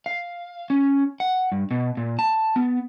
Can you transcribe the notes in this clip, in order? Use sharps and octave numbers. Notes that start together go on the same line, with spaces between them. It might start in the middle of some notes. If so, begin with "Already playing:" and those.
F5
C#4
F#5
G2
B2
A#2
A5
B3